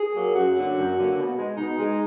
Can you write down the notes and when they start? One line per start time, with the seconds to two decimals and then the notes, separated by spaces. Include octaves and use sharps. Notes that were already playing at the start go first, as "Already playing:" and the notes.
Already playing: G#4
0.15 F#3 A#3
0.35 F#2 F#4
0.55 D3 F#3 A#3
0.76 F#2
0.97 D3 F#3 A#3
1.17 B2
1.37 G#3
1.57 B2 D#4
1.78 G#3